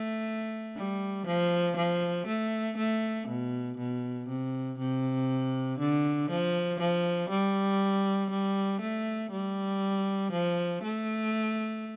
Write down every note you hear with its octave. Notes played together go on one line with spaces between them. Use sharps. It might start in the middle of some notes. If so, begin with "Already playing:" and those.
Already playing: A3
G3
F3
F3
A3
A3
B2
B2
C3
C3
D3
F3
F3
G3
G3
A3
G3
F3
A3